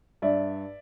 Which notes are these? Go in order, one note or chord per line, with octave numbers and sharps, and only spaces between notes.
G2 D5 E5